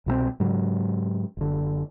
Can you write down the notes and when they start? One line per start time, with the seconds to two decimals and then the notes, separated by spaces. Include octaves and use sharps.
0.06 C2 B2 F#3 C4
0.40 G#2 C#3 F#3
1.37 F#1 D3